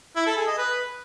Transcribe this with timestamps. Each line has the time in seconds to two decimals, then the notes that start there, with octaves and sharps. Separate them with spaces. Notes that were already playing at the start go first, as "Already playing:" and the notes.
0.16 E4
0.27 A4
0.37 G#4
0.47 D#5
0.58 B4